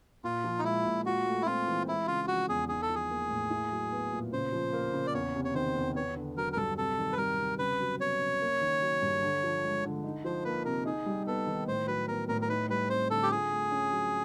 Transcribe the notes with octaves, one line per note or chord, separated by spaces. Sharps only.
A#2 F4
F3
D#4
G#3 E4
A#2
F4 F#4
A3
E4
C4 F4
E3
G#3 E4
C#3 F4
F3 F#4
E2 G#4
D#4 G#4
A4
F3
G#4
A#3
A2
E4
F#3
B3
A#2
C#3 C5
F3
A#3
C#3
D5
E2 C#5
C3
C#5
D#3 C5
E2
B3 C#5
D3
F#3 A#4
A#4
G2 A4
C3 A4
D#3
B4
G3 A#4
C3
C#3 B4
F#3
B3 C#5
C#3
A#3
D#3
F#3
G2
D3
F3
G#3
D3
D#4
F3 C5
A#3 B4
C3 A#4
D#4 G#4
G3
B3 A4
D#3
A2 C5
F#3 B4
B3 A#4
A2 A#4
A#4
D#4 B4
G3 B4
C4 C5
D3 A4
G4
F4 G#4
A3
C#4
F#3